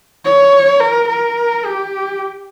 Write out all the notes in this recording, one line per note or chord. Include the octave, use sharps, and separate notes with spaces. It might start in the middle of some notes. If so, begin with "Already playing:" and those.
C#5
A#4
A#4
G4